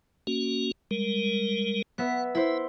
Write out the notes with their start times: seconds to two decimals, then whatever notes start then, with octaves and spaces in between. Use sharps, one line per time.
0.27 A#3 C#4 F#4
0.91 G3 G#3 A#4
1.98 B3 E5 F#5
2.35 E4 C5 E5